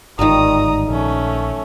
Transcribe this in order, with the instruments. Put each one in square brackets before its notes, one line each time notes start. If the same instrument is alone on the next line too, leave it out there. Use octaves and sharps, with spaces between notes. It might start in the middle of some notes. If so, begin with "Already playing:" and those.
[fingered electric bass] G1 G#2 [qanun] D#3 F3 G3 [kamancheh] A#5 D#6
[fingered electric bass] A#1 [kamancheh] A3 C#4